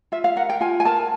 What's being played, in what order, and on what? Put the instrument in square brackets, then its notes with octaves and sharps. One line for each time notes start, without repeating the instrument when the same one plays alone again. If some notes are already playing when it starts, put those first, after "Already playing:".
[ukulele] F4 E5
F5
A#4 F#5
G5
F4 G#5
G#5
A#4 A5